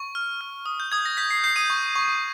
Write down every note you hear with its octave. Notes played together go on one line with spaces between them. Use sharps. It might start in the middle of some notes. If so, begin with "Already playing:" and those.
Already playing: C#6
F6
F6
D#6
G6
D#6 G#6
A#6
G6 B6
C7
G6 C7
D#6 D#7
C#6
C#6